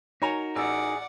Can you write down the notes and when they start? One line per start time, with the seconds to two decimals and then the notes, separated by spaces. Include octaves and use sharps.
0.22 D#4 F#4 A#4 C#5 G#5 A#5
0.56 A1 G#4 D5 F#5 E6